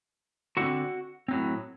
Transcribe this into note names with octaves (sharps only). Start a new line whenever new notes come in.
D3 A3 C4 F#4 F#5
A2 F#3 C4